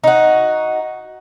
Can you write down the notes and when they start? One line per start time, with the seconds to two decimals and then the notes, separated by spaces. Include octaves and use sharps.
0.04 D#4 F#4